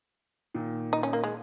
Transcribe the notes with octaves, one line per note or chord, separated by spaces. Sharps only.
A#2 D#3
D#4
C#4
A#3
G#3